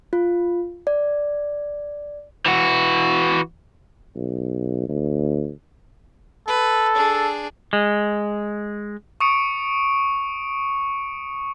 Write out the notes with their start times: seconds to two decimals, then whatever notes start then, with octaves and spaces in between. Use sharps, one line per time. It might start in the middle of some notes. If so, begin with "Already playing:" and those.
0.13 F4
0.87 D5
2.46 E3 F#4
4.16 B1
4.89 D2
6.47 A4 B4
6.95 D4 G#4
7.73 G#3
9.20 C#6 D#6 C#7 D7